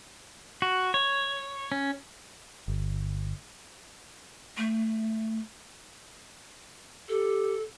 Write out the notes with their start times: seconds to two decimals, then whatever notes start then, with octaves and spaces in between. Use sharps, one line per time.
0.62 F#4
0.94 C#5
1.72 C#4
2.68 G1
4.57 A3
7.09 G4 A4